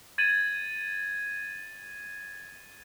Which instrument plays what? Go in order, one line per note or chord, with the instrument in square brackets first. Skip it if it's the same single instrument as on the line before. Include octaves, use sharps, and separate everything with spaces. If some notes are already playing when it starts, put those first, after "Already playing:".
[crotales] G#6 A6 D#7 F#7